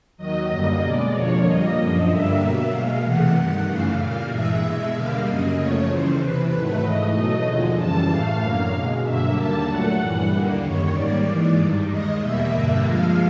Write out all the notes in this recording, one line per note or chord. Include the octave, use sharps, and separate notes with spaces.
D#2 D#3 F#3 D#5
F#2 D3 G3 A#3 D#5
B2 G#3 D5
F2 D3 F3 A#3 C#5
A#2 G3 A#3 D#5
F#2 D3 F3 D#5
G2 D3 G3 A#3 E5
B2 F#3 A#3
B2 G#3 F5
E2 C3 E3 A3 F#5
G2 D#3 G3
F#2 C#3 E3 A3 F5
A#2 G3 A#3
G2 E3 G#3 E5
B2 G#3
D#2 D3 G3 A#3 F5
F#2 C#3 F#3 A#3 D#5
F#2 C#3 F3 A3 C#5
D#2 C#3 E3 G3 C5
E2 C3 E3 B4
G#2 D#3 F#3 A3 B4
G#2 E3 A3 D#5
B2 F#3 A3
D#2 D3 F3 G#3
F#2 C#3 E3 G3 A5
A2 E3 A3 F5
F#2 D3 F#3 A#3
B2 G#3
G2 D3 F#3 A#3 E5
D#2 D3 G3 A#3 A5
A#2 F#3 A3 F#5
G2 E3 G3
D#2 D3 G3 A#3
F#2 D#3 G3 C#5
G#2 D#3 G3 A#3 D5
G#2 E3 G#3
G2 D#3 G3
D#2 D#3 G#3 D#5
E2 B2 G3 A#3 E5
G2 D3 G3 A#3
G2 D3 F3 G#3 F5